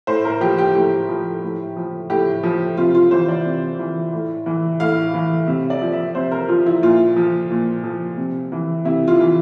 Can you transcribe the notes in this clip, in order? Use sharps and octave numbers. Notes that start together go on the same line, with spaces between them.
A2 C5
A#4
F3 G4
G4
A2 G4
F3
A2
F3
A2 G4
F3
C3 F4
F4
E3 C5
D5
C3
E3
A2
E3
A2 F5
E3
C3 E5
D5
F3
E5
C3 C5
A#4
F3 F4
E4
A#2 F4
F3
A#2
F3
C3
E3
C3 E4
F4
E3